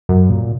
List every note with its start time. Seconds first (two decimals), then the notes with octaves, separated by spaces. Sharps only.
0.09 F#2
0.30 A#2